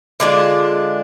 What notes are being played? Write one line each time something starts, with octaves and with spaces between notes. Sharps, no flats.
D3 G#3 D4 F4